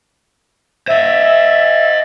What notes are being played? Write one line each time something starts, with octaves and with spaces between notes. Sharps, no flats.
C5 D#5 E5